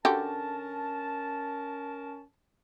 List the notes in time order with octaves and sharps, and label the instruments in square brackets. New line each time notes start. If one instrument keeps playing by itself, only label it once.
[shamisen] D3 F#4 G4 [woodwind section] C#4 A#4 A5